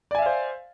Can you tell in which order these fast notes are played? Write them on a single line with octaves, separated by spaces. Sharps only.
D5 G#5 E5 F5 C5